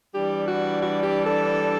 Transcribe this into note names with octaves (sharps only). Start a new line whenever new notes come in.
E3 G3 D4 G4
F#4
F#4
G4
A4